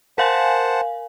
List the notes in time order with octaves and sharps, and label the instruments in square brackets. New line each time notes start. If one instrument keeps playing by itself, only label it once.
[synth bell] A#4 F5 G#5 [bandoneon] C5 F#5 A5